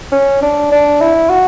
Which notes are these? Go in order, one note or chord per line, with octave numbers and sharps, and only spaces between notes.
C#4
D4
D4
E4
F#4